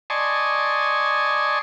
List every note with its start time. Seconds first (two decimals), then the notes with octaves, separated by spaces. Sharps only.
0.10 D5 D#5 G#5 A5 C6 C#6